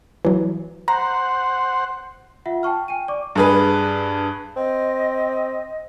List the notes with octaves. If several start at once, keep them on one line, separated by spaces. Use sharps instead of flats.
E3 F#3
C5 F#5 A#5
F4 E5 F#5
G5 A5 C#6 F6
G5 G#5 D#7
D5 C#6 D6
G2 G#4 B4
C4 D#5